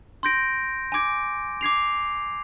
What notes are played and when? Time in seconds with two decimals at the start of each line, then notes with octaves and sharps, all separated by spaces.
0.23 C6 G6 A#6 D7
0.92 G#5 D6 G#6 D7
1.61 D6 G#6 C7 F7